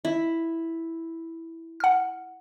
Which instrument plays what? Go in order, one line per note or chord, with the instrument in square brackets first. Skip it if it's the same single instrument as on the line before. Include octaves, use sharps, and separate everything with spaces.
[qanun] E4
[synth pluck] F#5 F6